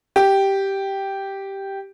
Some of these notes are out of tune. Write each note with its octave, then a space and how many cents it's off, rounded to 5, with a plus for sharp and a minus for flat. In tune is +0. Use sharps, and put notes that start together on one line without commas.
G4 -5